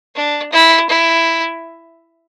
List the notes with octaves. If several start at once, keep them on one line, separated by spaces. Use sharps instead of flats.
D4
E4
E4